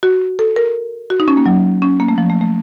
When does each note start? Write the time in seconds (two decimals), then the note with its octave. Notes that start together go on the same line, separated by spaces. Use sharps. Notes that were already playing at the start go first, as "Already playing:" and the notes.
0.03 F#4
0.39 A4
0.56 A#4
1.10 F#4
1.20 D#4
1.28 C#4
1.37 A#3
1.46 F#3
1.82 C#4
2.00 A#3
2.08 A3
2.18 F3
2.30 A3
2.41 A3